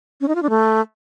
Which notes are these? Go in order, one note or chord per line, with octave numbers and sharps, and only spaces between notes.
C#4
D#4
F4
D4
A3